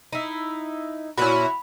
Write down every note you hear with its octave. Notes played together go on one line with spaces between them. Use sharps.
D#4 E4
A#2 A#3 C#4 E4 F#4 B5